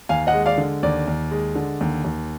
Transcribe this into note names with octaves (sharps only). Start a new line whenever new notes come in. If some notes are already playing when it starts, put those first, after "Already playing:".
D#2 F5 G#5
D#5 F#5
G#3
D5 F5
D3
D#2 D5
D#2
G#3
D3
D#2
D#2